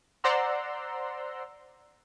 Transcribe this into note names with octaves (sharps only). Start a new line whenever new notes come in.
C5 D5 F#5 A#5 C6 E6